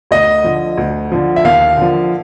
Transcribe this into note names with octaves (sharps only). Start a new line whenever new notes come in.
D2 D#5
D3 F3
D2
D3 F3
E5
D#2 F5
D3 F3